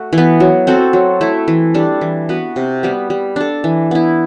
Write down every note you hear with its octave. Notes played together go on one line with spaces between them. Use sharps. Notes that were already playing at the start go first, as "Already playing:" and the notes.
Already playing: A3 F#4
E3
B3
F#3
C4 F#4 A4
F#3
A3 E4
E3
G3 D4 A4
E3
B3 F#4 B4
C3
G3 B3
G3
D4 A4
E3
B3 E4